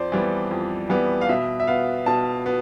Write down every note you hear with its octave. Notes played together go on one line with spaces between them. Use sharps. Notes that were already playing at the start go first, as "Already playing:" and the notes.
Already playing: F2 C5 D5
E3 G3 B3
F2
E3 G3 B3
F5
B2 E5
E5
B3 F5
B2 A5
B3